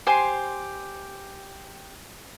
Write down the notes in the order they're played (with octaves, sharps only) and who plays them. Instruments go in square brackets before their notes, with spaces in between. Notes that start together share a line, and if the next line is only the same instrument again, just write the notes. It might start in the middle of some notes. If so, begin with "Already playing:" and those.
[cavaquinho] G4 C5 G#5 C6